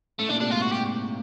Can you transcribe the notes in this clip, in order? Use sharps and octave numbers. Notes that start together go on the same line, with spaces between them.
A2 A3
A#2 D4
C3 D4
G#2 F4
F#4
G4